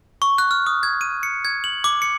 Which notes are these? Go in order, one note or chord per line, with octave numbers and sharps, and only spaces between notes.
C#6
F#6
F6
D#6
G#6
D#7
C#7
G#6
F#7
D6
C#7